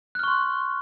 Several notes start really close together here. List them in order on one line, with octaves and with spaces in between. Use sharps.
F#6 F6 C#6 C6